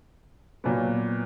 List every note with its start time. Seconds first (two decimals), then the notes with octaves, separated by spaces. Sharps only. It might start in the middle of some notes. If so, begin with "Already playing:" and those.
0.64 A#2 F#3 B3